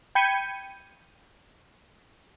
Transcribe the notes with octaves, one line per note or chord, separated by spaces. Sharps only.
G5 B5 G6 G#6 C#7 D#7